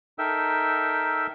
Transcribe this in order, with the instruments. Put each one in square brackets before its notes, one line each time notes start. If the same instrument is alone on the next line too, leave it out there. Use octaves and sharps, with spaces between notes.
[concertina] D#4 A4 A#4 E5 G5 E6